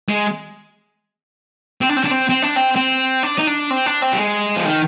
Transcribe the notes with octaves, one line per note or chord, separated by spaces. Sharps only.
G#3
C4
D4
C4
D4
C4
C4
D4
C4
C4
D4
D#4
D4
C4
D4
C4
G3
G#3
F3
D#3